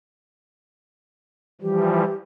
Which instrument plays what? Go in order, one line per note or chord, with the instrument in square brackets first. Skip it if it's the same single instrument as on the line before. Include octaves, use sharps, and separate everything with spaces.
[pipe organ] E3 F3 G3 [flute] G4